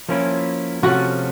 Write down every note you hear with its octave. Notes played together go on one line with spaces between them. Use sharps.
F3 A#3 C#4 E4
C3 F3 A3 C#4 F#4